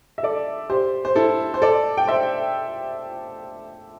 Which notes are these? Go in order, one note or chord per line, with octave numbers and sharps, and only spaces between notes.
E5
A4 D5
G4 C5
C5
E4 A4
C5
A4 D5
G5
C5 E5